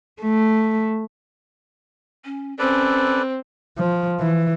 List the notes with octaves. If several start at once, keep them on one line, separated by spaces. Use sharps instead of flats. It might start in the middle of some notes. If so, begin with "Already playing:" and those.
A3
C#4
C4 C#4 A4 B4 D5
F3
E3